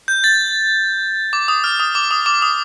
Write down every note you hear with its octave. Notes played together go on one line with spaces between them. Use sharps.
G6
A6
D6
D#6
F6
D#6
D6
D#6
D6
D#6